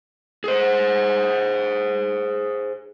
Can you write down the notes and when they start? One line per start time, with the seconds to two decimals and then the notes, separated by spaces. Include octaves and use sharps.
0.44 G#4 C5